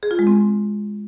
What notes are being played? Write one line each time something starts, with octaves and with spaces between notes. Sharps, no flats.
G#4
F4
G#3
C4